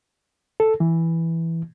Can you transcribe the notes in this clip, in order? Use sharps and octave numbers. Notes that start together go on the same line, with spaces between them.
A4
E3